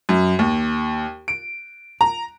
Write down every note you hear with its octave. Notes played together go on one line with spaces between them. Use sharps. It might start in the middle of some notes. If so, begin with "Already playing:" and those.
F#2
D#2
D7
A#5